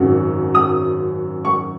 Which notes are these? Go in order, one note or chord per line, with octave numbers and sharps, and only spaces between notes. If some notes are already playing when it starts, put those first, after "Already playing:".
Already playing: G#1 F#2 C#3 F#3
D#6
C#6